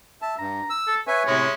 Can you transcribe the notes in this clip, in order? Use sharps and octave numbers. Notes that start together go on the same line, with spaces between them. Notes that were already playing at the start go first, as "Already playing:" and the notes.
E5 A5
G2 A#5
E6
A4
B4 C#5 E5 G#5
A2 C3 G#3 C#4 E4